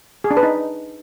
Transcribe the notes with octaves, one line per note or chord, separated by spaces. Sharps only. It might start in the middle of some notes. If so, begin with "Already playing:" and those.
G#4
D4
B4
D#4